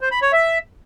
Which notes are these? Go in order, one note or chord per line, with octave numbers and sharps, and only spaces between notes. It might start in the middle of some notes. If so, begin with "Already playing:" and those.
C5
B5
C#5
E5